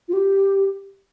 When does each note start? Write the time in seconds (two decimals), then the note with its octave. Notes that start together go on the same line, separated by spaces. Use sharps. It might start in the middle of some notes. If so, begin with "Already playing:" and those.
0.08 F4
0.13 G4